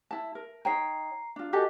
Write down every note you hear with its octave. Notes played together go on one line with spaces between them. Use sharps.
E4 A5
A#4
D#4 C#5 G5 A#5 C7
D4 F4
F#4 G4 A4 D#5 G#5 D6